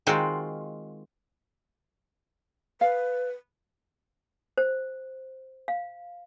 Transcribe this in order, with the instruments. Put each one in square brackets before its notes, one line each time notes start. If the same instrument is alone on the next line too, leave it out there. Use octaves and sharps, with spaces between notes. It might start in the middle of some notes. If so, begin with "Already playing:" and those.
[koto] D#3 G#3 C4 F4 F#4
[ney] B4 [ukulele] F5
[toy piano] C5
F5